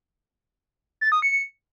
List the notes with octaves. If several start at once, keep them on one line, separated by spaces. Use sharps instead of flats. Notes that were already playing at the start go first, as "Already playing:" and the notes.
A6
D#6
C#7